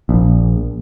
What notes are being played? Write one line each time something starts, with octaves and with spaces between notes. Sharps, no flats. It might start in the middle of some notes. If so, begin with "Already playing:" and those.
A#1